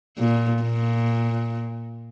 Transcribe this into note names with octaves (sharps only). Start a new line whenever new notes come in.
A#2
A#2